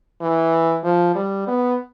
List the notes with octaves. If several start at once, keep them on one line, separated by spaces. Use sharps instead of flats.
E3
F3
G3
B3